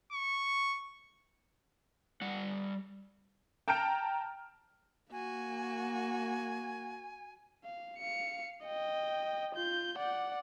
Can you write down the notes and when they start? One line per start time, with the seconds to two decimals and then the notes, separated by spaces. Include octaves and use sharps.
0.12 C#6
2.21 G3 F#5
3.68 G5 A5 A#5 F6 G6 D7
5.12 A#3 F#4 G#5
7.64 F5
7.98 F5 C#7
8.64 D#5 G5
9.55 F4 G6
9.98 D5 F#5